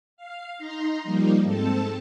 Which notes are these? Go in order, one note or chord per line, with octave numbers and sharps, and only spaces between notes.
F5
D#4 A#5 C6
F3 G3 A#3 D#4
G#2 C4 A4 A5